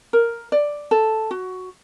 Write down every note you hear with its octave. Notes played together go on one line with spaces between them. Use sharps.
A#4
D5
A4
F#4